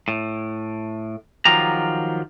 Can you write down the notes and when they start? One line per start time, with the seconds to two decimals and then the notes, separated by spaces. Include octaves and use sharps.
0.08 A2
1.45 D#3 F3 F#3 F4 G4 A#5